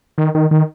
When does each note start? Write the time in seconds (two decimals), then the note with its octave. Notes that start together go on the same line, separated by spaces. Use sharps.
0.18 D#3
0.35 D#3
0.51 D#3